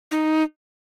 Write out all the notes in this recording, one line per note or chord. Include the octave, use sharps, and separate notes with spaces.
D#4